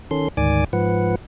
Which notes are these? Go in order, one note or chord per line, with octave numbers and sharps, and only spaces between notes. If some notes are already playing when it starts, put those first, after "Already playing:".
D#3 C#4 A4 C6
D2 G#2 D#3 D5 G#5 D6
G#2 F3 B4 F#5